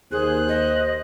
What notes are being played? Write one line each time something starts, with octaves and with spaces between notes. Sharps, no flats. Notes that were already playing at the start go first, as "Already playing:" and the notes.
D#2 G#4 C5 F#6
D#5